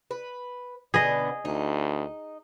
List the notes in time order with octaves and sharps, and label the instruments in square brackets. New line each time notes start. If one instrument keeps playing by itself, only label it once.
[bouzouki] B4
[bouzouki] B2 D3 B3 [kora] G#4 D#5
[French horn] D2 [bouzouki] D#4